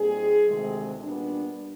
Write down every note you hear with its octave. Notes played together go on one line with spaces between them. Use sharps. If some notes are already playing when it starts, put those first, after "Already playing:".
Already playing: A#2 G3 C4 D#4 G#4
D2 C3 D#3 G#3 C4
A#2 G3 B3 D4